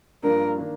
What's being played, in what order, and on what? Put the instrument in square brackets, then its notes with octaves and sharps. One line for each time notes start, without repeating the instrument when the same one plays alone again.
[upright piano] G2 F3 A#3 D4 [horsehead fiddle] A#4
[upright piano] D#3 A#3 D4